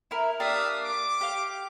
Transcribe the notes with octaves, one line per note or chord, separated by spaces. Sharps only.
E4 A#4
A#3 D4 G4 E5 F5 D#6
D6
G4 F5